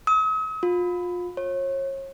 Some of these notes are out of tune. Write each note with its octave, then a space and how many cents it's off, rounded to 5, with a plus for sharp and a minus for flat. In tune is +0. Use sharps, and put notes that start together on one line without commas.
D#6 +45
F4 +30
C#5 -35